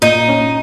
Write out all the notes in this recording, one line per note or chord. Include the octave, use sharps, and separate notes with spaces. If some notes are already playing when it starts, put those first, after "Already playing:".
A#2 D#4
C#4